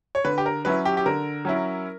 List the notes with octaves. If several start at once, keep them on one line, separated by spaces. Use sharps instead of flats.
C#5
D3 B4
G4
A#4
F#3 C#4 E4 B4
G4
G4
D3 A#4
F#3 C#4 E4